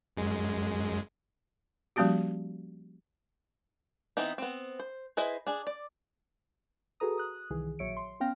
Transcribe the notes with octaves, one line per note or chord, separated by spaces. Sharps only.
F#2 G#3
F3 G3 A#3 C#4 F#4 G4
E3 B3 C4 D#4
B3 C4
C5
E4 G#4 B4 C5 D#5
D4 G#4
D5
F#4 G#4 A4 B4 A#5 D#6
D#6 F#6
C2 D#3 E3 G#4
A#1 F#3 C#5 E5 C#7 D7
C6
B3 C#4 F5 G5 F6 A#6